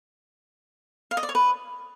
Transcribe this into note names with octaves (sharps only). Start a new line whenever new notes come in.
F5
D#5
D5
C#5
B4